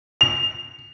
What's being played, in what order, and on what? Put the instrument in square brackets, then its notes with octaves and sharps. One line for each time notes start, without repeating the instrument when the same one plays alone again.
[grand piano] F7